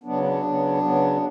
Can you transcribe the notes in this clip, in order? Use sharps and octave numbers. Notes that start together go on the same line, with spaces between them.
C#3 F#3 B3 D4
D4
C#3 F#3 B3
C#3 F#3 B3